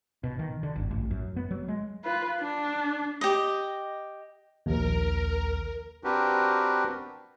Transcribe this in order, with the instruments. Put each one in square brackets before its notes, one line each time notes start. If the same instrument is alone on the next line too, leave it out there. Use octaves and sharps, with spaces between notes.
[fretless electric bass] B2
D#3
D3
G1
A1
F#2
B3
F#3
G#3
[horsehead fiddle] F4 B4
D4
[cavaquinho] G4 D#5
[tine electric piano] A#1 D#2 [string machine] A#4
[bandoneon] C4 D4 F#4 G4 A#4 B4